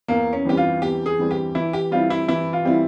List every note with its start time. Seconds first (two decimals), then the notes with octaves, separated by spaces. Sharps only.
0.08 E2 A#3
0.33 C#4
0.45 E3 G3 C4 G4
0.57 F4
0.82 E2 G4
1.06 G#4
1.19 E3 G3 C4
1.31 G4
1.55 E3 E4
1.73 G4
1.91 G3 C4 E4 F4
2.10 E4
2.28 E3 E4
2.53 F4
2.65 G3 C4 E4